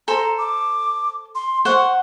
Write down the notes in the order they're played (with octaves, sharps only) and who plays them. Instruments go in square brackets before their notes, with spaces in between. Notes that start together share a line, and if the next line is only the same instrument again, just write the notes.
[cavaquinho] A4 C5 [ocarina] A#5
[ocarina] D6
C6
[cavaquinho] C5 F#5 [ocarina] C#6